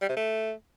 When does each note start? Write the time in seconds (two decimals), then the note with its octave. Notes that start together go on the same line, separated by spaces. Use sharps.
0.02 G3
0.09 C3
0.17 A3